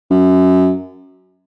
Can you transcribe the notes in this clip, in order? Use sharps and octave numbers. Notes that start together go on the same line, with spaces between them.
F#2